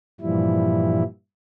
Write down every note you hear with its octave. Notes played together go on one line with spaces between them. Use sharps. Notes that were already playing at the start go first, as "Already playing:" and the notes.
G2 A#2 E3 F3 G3 E4